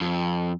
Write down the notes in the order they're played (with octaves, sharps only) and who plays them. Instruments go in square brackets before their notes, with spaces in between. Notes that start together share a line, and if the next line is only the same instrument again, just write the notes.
[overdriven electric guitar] F2